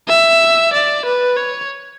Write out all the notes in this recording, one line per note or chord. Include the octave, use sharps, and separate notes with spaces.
E5
D5
B4
C#5